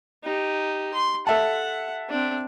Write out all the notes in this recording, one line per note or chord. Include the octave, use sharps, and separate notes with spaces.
D#4 G4
C6
A4 E5 F#5 A5
C4 D4